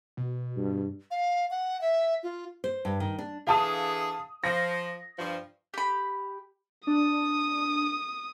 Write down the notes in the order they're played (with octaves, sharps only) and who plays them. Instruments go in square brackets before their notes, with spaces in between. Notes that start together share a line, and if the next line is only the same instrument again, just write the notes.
[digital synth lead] B2
[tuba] G2
[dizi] F5
F#5
E5
F4
[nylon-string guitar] C5
G2
D#3
D4
[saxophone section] D3 E3 G#4 [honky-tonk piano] F5 A5 D#6
[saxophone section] F3 [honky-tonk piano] A#6
[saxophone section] G2 F3
[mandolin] G4 B5
[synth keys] D4 [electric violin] D#6